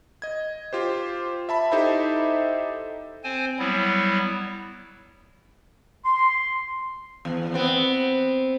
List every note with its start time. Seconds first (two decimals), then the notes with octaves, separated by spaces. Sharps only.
0.22 D#5 G#6
0.73 F4 G4 C5
1.49 E5 A5 B5
1.72 D#4 E4 G4 A4 C5 E5
3.24 C4 C5 G#5
3.59 F#3 G3 B3 E4
6.04 C6
7.25 E2
7.54 B3 C4